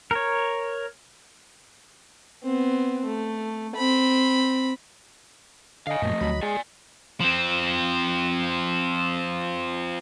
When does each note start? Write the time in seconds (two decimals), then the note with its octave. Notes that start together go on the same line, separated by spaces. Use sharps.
0.11 A#4 C#5
2.44 B3 C4
3.06 A3
3.76 C4 B5
5.87 D3 D#5 F5 G#5
6.02 F#2 A#2 F3 A3
6.21 D2 F#3 B5
6.43 G#3 G#4 D5 G#5
7.21 F3 C4